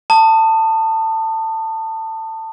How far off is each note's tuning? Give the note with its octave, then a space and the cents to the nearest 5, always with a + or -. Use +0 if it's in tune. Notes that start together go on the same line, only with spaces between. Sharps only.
A5 +20 D#6 -20